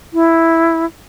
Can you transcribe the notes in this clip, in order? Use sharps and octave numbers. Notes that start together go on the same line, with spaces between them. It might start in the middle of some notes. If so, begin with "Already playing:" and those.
E4